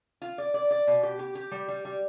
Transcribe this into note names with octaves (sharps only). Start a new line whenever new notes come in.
F4
D5
D5
D5
B2
G4
G4
G4
G3
G3
G3